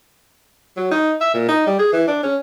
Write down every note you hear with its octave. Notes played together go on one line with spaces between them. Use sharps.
F#3
D#4
E5
A#2
D#4
G3
G#4
E3
D4
C#4